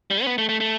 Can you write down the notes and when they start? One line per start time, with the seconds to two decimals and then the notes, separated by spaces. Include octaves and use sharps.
0.11 G3
0.23 C#4
0.27 B3
0.38 A3
0.49 A3
0.60 A3